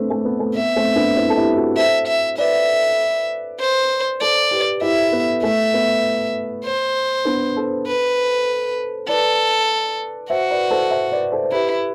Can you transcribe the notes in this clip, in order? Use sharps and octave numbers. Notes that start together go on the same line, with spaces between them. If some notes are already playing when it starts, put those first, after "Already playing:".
Already playing: A3 B3 C4 D4
A3
B3
A3
B3 E5
A3 C4
B3 D4
C4 E4
A4
E4 G4
F#4 A4
A4 C5 E5
E5
B4 D5 E5
C5
A4 C5 D5
G4 B4
E4 G4 E5
B3
A3 E5
B3
C5
B3 D4
A4 C5
B4
A4 B4 D5
F#4 C5 E5
B4 D5
A4 C5
C5 E5
B4 D5
A4 C5
C5
E4 G4 B4